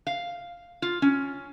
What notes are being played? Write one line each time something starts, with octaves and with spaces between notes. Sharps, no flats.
F5
F4
C#4